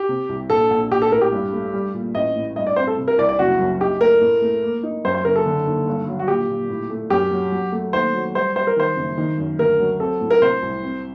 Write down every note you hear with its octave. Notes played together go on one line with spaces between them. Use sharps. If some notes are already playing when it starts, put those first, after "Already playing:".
Already playing: G4
C3
C2
A#1 A4
A#1
A#1 G4
A4
A2 A#4
G4
G2
A3
G3
A#2
A1 D#5
A2
G2 D#5
D5
C4 C5
A4
C3
A#4
C2 D5
D5
F#1 F#4
F#2
D#4 G4
A3 A#4
A2
A3
A#3
D#4
F#2 C5
C5
F#1 A#4
A4
D3
D#2
G2
F#3
F#4
A#2 G4
A#2
A2
A3
F#2 G4
F#3
F#3
A3
D#2 C5
F#3
G3 C5
G3 C5
A#4
D#3 C5
F#1
D#3
F#2
D2 A#4
F#3
C4 A4
A2
A#4
C3 C5
C2
C4